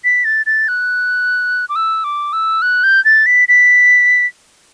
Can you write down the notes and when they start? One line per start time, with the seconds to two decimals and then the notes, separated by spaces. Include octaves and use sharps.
0.04 B6
0.25 A6
0.46 A6
0.68 F#6
1.69 D6
1.76 E6
2.04 D6
2.33 E6
2.62 F#6
2.83 G6
3.05 A6
3.26 B6
3.48 B6